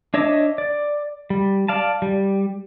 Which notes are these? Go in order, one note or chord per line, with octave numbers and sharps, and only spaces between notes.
D4 C#5 D#5 E5 D6
D5
G3
D5 F5 A5
G3